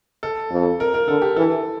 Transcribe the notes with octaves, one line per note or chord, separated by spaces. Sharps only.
A4
F2
A#4
A#4
D3 A4
G4
E3 A4